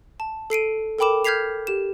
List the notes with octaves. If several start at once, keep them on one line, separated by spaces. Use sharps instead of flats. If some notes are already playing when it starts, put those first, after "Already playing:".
A5
A4 C7 D7 D#7
A4 A#4 G5 B5 D6 E7
F6 G6 G#6 B6 C7 F7
G4 E7